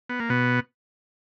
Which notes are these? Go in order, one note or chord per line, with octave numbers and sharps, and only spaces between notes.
B3
A#3
B2 B3